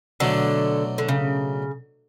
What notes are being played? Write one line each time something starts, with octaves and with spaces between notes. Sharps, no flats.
B2 D3 F#3 A3 D4
D3
C#3